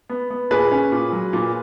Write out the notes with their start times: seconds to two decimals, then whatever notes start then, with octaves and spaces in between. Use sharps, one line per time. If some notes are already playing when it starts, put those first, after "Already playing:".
0.09 B3
0.31 B3
0.51 A#2 G#4 B4
0.71 C#4
0.92 A#2
1.12 F#3
1.33 A#2